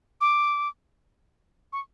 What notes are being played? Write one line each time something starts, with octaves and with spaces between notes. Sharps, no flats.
D6
C#6